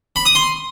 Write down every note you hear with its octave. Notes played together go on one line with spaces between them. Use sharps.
B5
D#6
C6